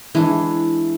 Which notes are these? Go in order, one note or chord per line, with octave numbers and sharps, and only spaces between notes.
E3 G#3 D4